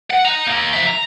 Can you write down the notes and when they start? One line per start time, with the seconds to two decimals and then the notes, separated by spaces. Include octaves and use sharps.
0.11 F#5
0.25 D#4 A#5
0.47 A#3 D#4
0.73 F3 E5
0.87 A#5